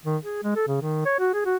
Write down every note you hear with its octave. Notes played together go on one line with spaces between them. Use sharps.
D#3
G#4
G#3
A4
C#3
D#3
C#5
F#4
G#4
F#4